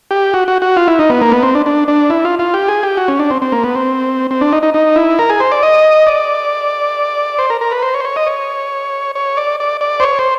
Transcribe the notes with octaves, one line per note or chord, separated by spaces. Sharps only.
G4
F#4
F#4
F#4
F4
E4
D#4
B3
A#3
B3
C4
D4
D4
D4
E4
F4
F4
G4
G#4
G4
F#4
C#4
D4
C4
C4
A#3
B3
C4
C4
D4
D#4
D#4
D#4
E4
A#4
G#4
C5
D5
D#5
D5
C5
A#4
A#4
B4
C5
C#5
C5
C#5
D#5
C#5
C#5
D5
D5
D5
C5
C#5
C5